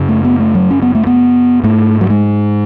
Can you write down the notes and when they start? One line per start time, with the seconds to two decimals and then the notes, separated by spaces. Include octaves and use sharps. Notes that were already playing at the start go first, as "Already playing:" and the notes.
Already playing: F#2 C#3
0.09 A3
0.25 B3
0.40 A3
0.55 F#3
0.70 C#4
0.82 B3
0.95 A3
1.07 B3
1.64 G#2 A3
2.01 F#3
2.10 G#3